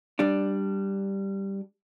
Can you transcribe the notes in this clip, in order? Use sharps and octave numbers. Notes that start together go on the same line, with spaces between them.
G3 D4